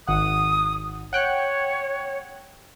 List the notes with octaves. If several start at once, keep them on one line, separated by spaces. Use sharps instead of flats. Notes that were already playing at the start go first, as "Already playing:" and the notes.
G#1 F#5 D#6
C#5 F#5 G5 F#6